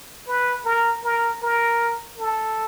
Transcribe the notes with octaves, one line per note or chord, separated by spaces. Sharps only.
B4
A#4
A#4
A#4
A4